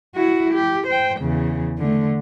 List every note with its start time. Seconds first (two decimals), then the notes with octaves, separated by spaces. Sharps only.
0.15 E4 F#4
0.53 G4
0.87 C5 G5
1.19 E2 C#3
1.78 D3 A3